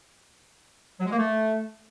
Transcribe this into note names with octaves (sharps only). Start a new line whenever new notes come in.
F#3
G#3
A#3
A3